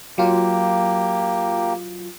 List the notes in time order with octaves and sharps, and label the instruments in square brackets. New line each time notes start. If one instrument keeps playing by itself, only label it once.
[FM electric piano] F#3 F4 [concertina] A#3 G4